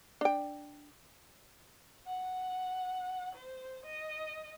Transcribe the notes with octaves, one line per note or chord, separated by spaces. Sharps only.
D4 G5
F#5
C5
D#5